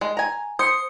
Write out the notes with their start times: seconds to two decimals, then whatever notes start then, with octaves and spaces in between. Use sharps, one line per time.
0.01 G#3
0.17 G#5 A#5
0.59 C5 D#6 C#7